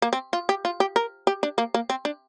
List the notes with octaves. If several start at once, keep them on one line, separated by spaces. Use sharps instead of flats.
A#3
C4
F4
G4
F4
G4
A#4
G4
D4
A#3
A#3
C4
D4